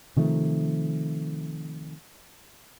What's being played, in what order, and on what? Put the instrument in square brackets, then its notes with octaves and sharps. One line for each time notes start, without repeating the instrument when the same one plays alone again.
[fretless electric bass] C3 D#3 F3 A3